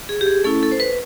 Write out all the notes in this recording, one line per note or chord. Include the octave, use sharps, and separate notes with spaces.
G#4
G4
G#4
A3 C#4 E4 A4
A4
C5
B4